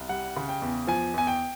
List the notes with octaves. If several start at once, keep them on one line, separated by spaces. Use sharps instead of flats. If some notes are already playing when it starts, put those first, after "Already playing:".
Already playing: C2
G3 F#5
C#3
G5
E2
F3 G#5
E2 G#5
G5